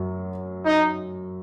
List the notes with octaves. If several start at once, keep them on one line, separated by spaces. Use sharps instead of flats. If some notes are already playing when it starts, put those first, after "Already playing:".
Already playing: F#2 F#3
D#4